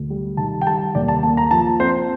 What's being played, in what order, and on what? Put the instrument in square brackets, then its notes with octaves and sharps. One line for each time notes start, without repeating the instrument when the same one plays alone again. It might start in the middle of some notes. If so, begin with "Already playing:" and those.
Already playing: [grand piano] D2
G3
D#3 A5
G5
G3 A5
D#2 D5
A5
A#3 A5
A#5
F3 A5
C4 C5